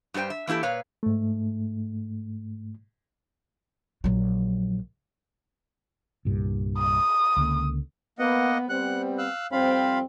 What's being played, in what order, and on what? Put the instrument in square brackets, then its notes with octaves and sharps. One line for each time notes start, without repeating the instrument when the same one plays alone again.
[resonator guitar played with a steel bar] G2 G3 F#4 C5 G5
E5
E3 A#3 E4 G4 A4
A#2 B4 C#5 F5
[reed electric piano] G#2 A3
[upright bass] A#1 F#3
[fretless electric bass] C2 G2 A#2
[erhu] D#6
[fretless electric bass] C#2 D3 A#3
[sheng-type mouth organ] A#3 D#5 F#5 [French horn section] B3
[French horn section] G3 B3 C4 [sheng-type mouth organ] F#5 F#6
[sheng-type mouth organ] F5 E6 F#6
[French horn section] F2 G3 C4 [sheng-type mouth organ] F4 F5 B5